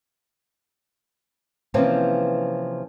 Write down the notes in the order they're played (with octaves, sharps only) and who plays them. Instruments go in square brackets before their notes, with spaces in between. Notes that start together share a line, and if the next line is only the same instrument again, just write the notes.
[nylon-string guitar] C3 E3 F3 A#3 C4 C#4